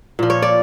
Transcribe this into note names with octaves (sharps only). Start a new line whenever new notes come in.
A#2 F3
C#5
D5